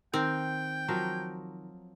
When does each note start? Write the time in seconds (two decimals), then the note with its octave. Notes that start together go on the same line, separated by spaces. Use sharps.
0.14 D#3 C4 A#4 G5
0.88 F3 F#3 A#4